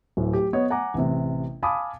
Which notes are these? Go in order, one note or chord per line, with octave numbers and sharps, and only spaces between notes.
D1 A2
G4
B3 C#5 D#5
F#5 G#5 A#5 D6
A1 C3
F5 G#5 A5 B5 D6 D#6